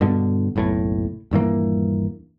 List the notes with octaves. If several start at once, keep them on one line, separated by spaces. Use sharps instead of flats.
G2 B2 D3
F#1 B1 A2
D#1 G2 E3 A#3